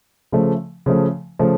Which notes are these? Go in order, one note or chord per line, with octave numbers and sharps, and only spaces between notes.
C#3 F3 A3
C#3 F3 A3
C#3 F3 A3